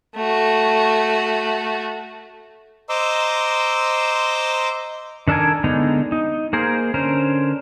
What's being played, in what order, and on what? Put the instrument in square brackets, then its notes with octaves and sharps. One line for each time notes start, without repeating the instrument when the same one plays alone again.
[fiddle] A3 F#4
[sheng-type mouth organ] C5 D#5 A#5 C6 D6 E6
[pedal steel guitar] D#3 D4 A4 A#4 G#5
D3 G#3 B3 D#4
D#4
A#3 G#4 A#4 C5
D3 C#4 A#4 C5